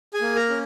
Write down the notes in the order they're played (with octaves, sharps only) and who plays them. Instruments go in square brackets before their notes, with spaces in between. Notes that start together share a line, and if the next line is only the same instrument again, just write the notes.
[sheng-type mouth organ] G#4 G#5
A#3
A#4 A#5
C#4